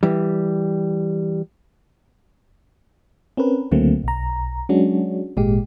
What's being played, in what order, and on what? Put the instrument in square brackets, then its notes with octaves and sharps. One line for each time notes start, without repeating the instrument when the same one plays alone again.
[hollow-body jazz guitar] E3 G3
[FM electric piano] C4 C#4 A#4 B4
C#2 D3 F#3 A3 A#3 C4
B1 A#5
F#3 G#3 C#4 D4 F#4
G#1 A#2 G#3 G4